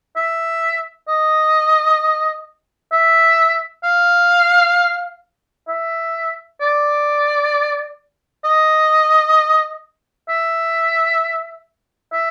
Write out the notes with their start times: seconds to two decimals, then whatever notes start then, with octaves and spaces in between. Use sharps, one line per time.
0.16 E5
1.08 D#5
2.92 E5
3.84 F5
5.68 E5
6.61 D5
8.44 D#5
10.29 E5
12.13 E5